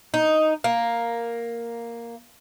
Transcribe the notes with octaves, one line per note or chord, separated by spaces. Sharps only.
D#4
A#3